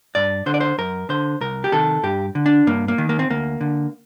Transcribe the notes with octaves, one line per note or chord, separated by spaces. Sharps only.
G2 D5
D3 C5
D5
C5
F#2 A#4
D3 C5
C2 A#4
G4
C3 D#3 A4
G2 G4
D3
D4
G2 A#3
A#3
D#3
A#3
C4
D2 A#3
D3